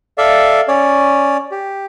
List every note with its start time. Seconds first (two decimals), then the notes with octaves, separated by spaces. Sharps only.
0.18 A4 D5 E5 F5
0.68 C#4 C#5 D5
1.52 G4